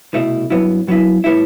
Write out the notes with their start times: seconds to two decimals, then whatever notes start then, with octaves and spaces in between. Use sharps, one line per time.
0.14 C2 B2 A3 E4
0.50 G2 F#3 B3 E4
0.87 G2 F#3 B3 E4
1.24 A2 G3 B3 E4